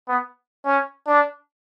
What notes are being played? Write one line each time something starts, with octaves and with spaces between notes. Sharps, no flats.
B3
C#4
D4